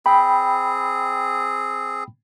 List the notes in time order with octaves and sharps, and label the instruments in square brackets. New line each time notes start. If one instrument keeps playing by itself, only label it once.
[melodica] C4 G#4 [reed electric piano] G5 B5